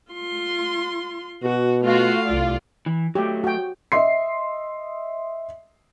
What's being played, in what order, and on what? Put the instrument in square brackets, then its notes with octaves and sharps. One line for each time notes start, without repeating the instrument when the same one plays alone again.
[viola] F4 C6
[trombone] B2 [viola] F#4
[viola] A3 F5 [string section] F4 F#4
[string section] C2 F4 D5
[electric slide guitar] E3
[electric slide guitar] F#3 A3 [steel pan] G4
[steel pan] F#4 G5
[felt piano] D#5 E5 C6 C7